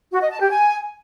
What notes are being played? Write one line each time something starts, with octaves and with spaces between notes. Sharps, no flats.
F#4
D#5
A5
G4
G#5